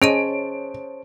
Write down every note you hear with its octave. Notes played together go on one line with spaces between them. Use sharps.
C#4 G#4 C5 C#5 D#5 A5 D7 D#7